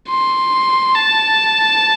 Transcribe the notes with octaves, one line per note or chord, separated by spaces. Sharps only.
C6
A5